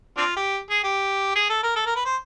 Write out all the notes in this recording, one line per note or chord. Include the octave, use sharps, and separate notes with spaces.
C4 D4 F4
G4
G#4
G4
G#4
A4
A#4
A4
A#4
B4
C5